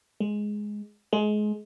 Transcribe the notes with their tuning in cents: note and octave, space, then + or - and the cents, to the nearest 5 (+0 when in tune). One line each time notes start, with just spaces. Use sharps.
G#3 +5
G#3 +25